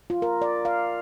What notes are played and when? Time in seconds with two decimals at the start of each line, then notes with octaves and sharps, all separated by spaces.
0.10 F4
0.22 A#4
0.42 D5
0.65 F5